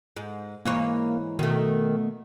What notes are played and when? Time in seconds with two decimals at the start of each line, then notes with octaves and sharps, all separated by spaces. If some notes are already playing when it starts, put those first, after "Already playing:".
0.16 G#2
0.65 G#2 E3 A#3 C#5
1.39 B2 D#3 A3